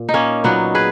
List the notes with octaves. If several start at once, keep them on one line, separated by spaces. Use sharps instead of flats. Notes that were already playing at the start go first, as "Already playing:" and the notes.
Already playing: A#2
D#4
A#3 C#4
A#2 F#3 B3 D#4
G#4 B4